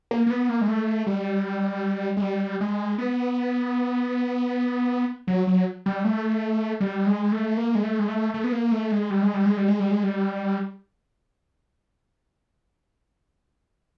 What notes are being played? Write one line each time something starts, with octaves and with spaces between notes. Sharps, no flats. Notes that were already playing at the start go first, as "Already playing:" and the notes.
A#3
A#3
B3
A#3
G#3
A3
G3
G#3
G3
G#3
B3
F#3
F#3
G3
A3
G3
G#3
A3
A#3
G#3
A3
G#3
A3
A3
B3
A#3
A3
G#3
G3
G#3
G3
G#3
G3
G#3
G3
G#3
G3